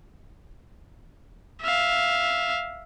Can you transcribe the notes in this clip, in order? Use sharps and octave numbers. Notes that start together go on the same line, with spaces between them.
E5 F5